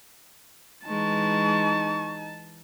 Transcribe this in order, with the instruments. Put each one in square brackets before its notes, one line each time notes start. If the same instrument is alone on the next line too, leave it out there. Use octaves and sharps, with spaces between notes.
[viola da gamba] E3 G#3 [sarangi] D#4 [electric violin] A5 [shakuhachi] C#6